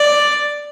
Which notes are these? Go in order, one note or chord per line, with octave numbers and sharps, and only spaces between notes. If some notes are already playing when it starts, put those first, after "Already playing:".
Already playing: D5